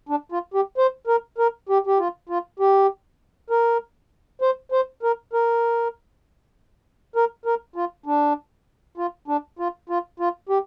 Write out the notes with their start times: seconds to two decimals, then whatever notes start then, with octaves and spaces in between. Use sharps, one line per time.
0.09 D4
0.32 F4
0.54 G4
0.78 C5
1.07 A#4
1.38 A#4
1.69 G4
1.87 G4
1.99 F4
2.29 F4
2.59 G4
3.50 A#4
4.41 C5
4.72 C5
5.03 A#4
5.33 A#4
7.16 A#4
7.46 A#4
7.76 F4
8.06 D4
8.97 F4
9.28 D4
9.59 F4
9.89 F4
10.20 F4
10.49 G4